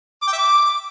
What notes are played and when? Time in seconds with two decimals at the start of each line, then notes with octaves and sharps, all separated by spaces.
0.22 D6
0.28 G5
0.33 E5
0.38 D6